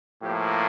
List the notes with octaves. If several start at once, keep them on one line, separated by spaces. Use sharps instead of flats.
A2 F3 A#3 G4